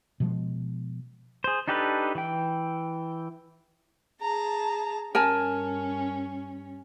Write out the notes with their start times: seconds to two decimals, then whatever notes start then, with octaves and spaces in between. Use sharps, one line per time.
0.20 B2 F3 G#3
1.44 G#4 C5
1.68 D4 D#4 G4 A4 B4
2.15 E3 G5
4.21 G#4 A5 A#5
5.15 G2 C#4 A#4 G#5 A5